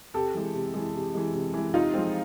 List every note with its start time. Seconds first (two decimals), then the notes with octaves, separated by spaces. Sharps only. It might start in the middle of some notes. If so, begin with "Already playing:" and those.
0.14 C3 G4 A4
0.35 E3 G#3
0.54 C3
0.74 E3 G#3
0.94 C3
1.14 E3 G#3
1.34 C3
1.54 E3 G#3
1.74 C3 D#4 F4
1.94 F3 G#3 C4